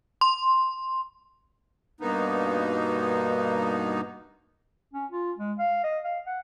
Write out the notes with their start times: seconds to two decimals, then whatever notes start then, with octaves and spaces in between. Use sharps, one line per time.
0.21 C6
2.01 G2 B2 A#3 B3 D#4
4.94 C#4
5.11 F4
5.38 G#3
5.58 F5
5.84 D#5
6.05 F5
6.26 F#5